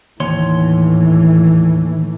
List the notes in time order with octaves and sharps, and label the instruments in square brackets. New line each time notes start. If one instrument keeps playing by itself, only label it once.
[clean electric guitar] D#2 C#5 C6 [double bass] A2 E3